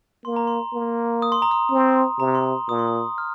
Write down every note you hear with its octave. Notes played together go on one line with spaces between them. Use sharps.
A#3 C6
A#5
C6
A#3
D#6
C6
A#5
C6
C4
C3 A#5
C6
A#5
A#2 D#6
C6
D#6
F6